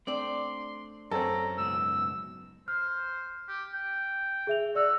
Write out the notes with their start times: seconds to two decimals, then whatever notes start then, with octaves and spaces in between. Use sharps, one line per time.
0.07 A3 C4 D4 D5 C6
1.11 F#2 C4 C#4 A4 A#5
1.57 C#2 G#2 B2 E6
2.68 C5 F6
3.48 G4
3.73 G5
4.47 G#4 E5 F7
4.75 F#4 D5 E6